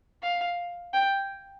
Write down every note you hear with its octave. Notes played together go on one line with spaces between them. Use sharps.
F5
G5